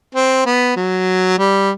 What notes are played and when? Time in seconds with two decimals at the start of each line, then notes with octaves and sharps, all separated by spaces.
0.15 C4
0.46 B3
0.77 F#3
1.38 G3